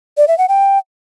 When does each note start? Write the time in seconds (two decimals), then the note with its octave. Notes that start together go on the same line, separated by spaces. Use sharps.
0.17 D5
0.28 E5
0.38 F#5
0.49 G5